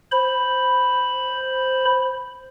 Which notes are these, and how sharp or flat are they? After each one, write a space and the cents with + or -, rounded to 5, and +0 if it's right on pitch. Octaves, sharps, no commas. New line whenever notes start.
C5 +0 B5 +0